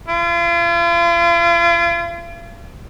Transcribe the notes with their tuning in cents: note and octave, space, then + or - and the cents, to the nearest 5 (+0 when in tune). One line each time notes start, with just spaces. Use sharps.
F4 -40